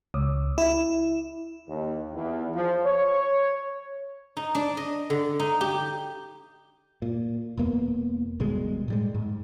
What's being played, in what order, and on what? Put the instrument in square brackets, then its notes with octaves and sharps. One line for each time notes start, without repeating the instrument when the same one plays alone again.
[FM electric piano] C#2
E4
[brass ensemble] D#2
E2
F3
C#5
[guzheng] D#4
D4
D#5
D3
D#4
G4
[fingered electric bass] A#2
E1 E2 A#3 B3
G#1 B2 G3 G#3
A2 G3 G#3
G#2